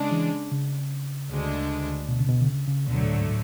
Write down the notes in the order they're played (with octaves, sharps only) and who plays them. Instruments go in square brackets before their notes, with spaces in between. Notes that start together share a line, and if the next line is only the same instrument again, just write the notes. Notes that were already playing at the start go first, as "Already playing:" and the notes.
Already playing: [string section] C#3 G#3 D4
[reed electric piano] E3
C#3
[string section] D2 D3 G#3 D4
[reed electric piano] B2
C#3
B2
D3
C#3
C#3
[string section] D2 D3 F#3 A3 [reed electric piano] B2
[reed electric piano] A2
G#2
A2